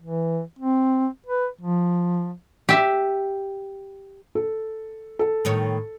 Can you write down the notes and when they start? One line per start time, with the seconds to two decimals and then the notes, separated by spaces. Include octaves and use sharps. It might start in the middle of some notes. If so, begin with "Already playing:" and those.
0.02 E3
0.59 C4
1.26 B4
1.61 F3
2.69 G4 E5
4.35 A4
5.19 A4
5.45 A2 D#3 C#5